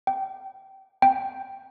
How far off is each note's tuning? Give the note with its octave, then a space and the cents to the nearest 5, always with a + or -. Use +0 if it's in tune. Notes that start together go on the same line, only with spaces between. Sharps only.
G5 -20
G5 +0